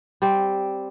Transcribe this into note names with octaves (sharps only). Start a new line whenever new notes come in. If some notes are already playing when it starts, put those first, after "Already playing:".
G3 C4